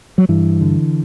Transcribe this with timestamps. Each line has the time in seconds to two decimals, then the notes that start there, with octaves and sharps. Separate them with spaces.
0.18 F#3
0.29 G2 E3
0.61 D3